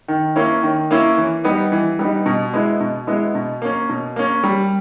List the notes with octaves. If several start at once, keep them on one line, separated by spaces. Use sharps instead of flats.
D#3
A#3 C#4 E4
D#3
A#3 C#4 E4
E3
G3 B3 D#4
E3
G3 B3 D#4
B2
G#3 B3 E4
B2
G#3 B3 E4
B2
A#3 C#4
B2
A#3 C#4
G3